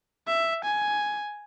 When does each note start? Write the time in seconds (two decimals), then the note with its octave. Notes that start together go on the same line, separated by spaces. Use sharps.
0.27 E5
0.65 G#5